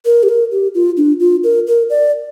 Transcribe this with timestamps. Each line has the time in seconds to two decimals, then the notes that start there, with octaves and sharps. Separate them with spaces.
0.05 A#4
0.23 G4
0.29 A#4
0.52 G4
0.75 F4
0.97 D4
1.20 F4
1.44 A#4
1.67 A#4
1.90 D5